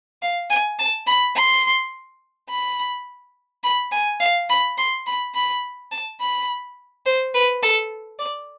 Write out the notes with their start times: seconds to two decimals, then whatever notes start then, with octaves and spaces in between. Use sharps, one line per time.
0.22 F5
0.50 G#5
0.79 A5
1.06 B5
1.35 C6
2.49 B5
3.63 B5
3.91 G#5
4.20 F5
4.49 B5
4.78 C6
5.06 B5
5.35 B5
5.91 A5
6.20 B5
7.06 C5
7.34 B4
7.62 A4
8.19 D5